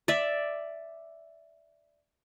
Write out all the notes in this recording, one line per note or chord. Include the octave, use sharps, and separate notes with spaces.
D5 E5